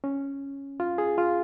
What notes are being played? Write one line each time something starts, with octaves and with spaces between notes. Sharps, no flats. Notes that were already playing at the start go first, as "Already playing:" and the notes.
C#4
F4
G#4
F4